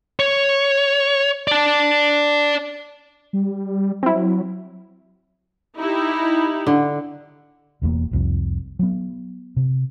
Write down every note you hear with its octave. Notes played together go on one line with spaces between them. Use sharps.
C#5
D5 A5
G3
F#3 C4 E4
D#4 E4 G4
D3
E1 E2 F#3 A#3
F1 C2 F2
F#3 B3
C3